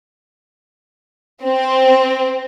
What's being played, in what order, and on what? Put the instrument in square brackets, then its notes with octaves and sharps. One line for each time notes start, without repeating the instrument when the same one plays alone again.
[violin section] C4